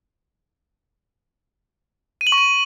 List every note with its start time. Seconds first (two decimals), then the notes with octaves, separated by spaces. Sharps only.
2.21 D#7
2.27 F#7
2.32 C#6
2.38 D#7